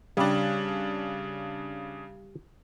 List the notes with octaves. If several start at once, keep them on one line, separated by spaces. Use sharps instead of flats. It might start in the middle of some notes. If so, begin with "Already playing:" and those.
C#3 G3 D4